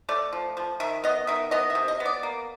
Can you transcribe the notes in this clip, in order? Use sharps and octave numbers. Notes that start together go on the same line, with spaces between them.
A3 D5
F3
F3
D#3 E5
B3 D#5
D#3 E5
B3 D#5
E5
C3
D#5
B3
D5
A#3